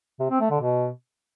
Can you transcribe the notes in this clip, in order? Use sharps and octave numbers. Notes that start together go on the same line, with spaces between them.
C3
C4
A3
D3
B2